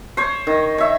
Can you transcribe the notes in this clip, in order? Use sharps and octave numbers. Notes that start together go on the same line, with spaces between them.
C5 C#5
D#3
C#5 E5